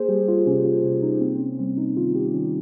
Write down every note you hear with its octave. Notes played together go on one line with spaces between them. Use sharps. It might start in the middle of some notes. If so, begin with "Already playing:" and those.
Already playing: A#3 G#4 C5
G3 G4
F4
C3 C#4
F4
C3 F4
D#4
A#3 C4
C4
C#4
G3 C4
D#4
D#3 F4
G4
D#3 C#4